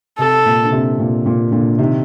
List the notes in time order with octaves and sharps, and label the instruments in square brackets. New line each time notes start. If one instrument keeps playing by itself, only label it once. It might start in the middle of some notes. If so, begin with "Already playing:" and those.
[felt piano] C3 [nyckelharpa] A4
[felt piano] A#2
D3
C3
A#2
A#2
A#2 D3
C3 D#3